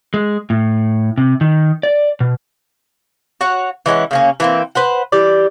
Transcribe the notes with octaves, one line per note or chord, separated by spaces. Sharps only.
G#3
A2
C3
D#3
D5
B2
F#4 C#5 F#5
E3 G#3 C#4 F#5
C#3 A#3 C#4
E3 A#3 C4
B4 C5 F#5
E3 G4 D5